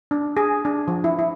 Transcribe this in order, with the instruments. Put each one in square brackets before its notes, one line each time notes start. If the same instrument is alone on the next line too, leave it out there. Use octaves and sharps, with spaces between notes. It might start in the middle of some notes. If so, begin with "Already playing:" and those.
[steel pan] D4
G#4
D4
F3
E4
E4